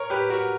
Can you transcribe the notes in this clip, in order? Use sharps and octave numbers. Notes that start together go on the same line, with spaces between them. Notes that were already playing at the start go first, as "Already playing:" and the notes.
Already playing: A#4 C#5
G4 B4
F#4 A#4